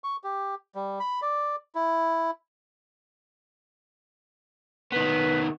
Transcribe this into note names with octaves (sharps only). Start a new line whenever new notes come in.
C#6
G4
G3
B5
D5
E4
D#3 B3 B4